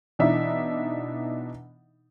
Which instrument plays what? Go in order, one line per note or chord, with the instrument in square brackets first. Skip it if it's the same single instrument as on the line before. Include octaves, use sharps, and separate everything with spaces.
[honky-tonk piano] B2 E3 D4 D#4 E5